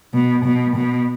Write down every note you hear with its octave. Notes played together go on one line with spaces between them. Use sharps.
B2
B2
B2